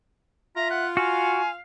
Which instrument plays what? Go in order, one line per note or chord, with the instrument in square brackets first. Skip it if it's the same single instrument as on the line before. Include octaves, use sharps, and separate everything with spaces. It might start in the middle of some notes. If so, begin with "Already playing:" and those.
[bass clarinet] F4 [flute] E5 [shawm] A#5
[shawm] F#5
[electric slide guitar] F#4 [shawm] F5 [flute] G#5